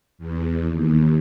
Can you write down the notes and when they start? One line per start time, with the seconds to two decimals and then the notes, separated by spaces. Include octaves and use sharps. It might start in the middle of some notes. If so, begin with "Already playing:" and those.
0.18 E2
0.69 D#2